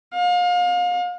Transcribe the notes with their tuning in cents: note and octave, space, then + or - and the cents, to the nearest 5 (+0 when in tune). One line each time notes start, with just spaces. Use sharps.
F5 +35